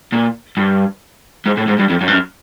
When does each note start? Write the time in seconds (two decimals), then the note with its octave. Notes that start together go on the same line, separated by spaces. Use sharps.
0.13 A#2
0.57 G2
1.46 G#2
1.57 A2
1.68 G#2
1.79 G2
1.90 F2
2.01 F#2
2.08 G2
2.12 F#2